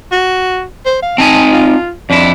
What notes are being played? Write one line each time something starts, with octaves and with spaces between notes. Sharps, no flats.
F#4
C5
F5
C4 D#4 G#5 A5
F4
F2 D4 E4